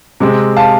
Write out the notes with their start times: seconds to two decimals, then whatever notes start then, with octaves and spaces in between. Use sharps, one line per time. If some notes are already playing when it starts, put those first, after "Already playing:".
0.20 C3 G#3 C4
0.56 F5 A5